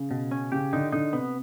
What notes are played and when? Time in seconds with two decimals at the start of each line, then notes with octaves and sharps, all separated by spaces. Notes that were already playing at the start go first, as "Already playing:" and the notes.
Already playing: C#3
0.11 B2
0.31 C#4
0.52 C#3 G4
0.73 D3 D#4
0.92 D3 D#4
1.13 C3 B3